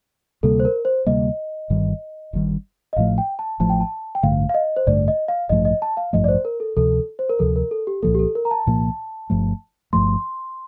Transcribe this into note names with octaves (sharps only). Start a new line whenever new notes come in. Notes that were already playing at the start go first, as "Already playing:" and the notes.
D2 C3 G3 A#3 A4
C5
A#4
C5
D2 C3 G3 A#3 D#5
G1 G2 D#3 G3
G1 G2 D#3 G3
D#5
A1 A2 F3 A3 F5
G5
A5
A1 A2 F3 A3 A5
G5
A5
G5
A1 G2 D3 A3 F5
F5
D#5
C5
A1 G2 D3 A3 D5
D#5
F5
A1 G2 F3 A3 D#5
D#5
A5
F5
A1 G2 F3 A3 D#5
D5
C5
A#4
A4
D2 C3 F3 A4
C5
A#4
D2 C3 F3 A4
A#4
A4
G4
C2 A#2 F3 A#3 A4
G4
A4
A#4
A#5
A5
C2 A#2 F3 A#3
G1 G2 F3 A3
G1 G2 F3 A3 C6